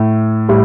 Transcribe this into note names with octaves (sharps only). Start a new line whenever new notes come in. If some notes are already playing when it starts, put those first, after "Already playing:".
Already playing: A2
A2 G3